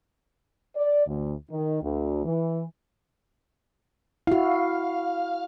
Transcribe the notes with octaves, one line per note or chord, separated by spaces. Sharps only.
D5
D2
D#3
D2
E3
E4 F#4 F5